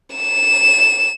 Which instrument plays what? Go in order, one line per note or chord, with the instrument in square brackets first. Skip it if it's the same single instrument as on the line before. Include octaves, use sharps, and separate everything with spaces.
[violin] E7